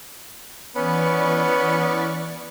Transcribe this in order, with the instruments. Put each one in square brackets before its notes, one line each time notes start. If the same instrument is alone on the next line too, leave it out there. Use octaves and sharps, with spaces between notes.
[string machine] E3 D5 C#6 [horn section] B3 C#4